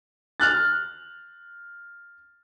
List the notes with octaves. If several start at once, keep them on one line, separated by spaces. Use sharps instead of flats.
F6 F#6 A6